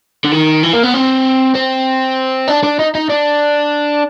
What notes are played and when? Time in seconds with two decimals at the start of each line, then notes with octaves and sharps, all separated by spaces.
0.24 D3
0.32 D#3
0.63 E3
0.73 A#3
0.83 B3
0.94 C4
1.55 C4
2.48 D4
2.63 D4
2.79 D#4
2.95 D#4
3.10 D4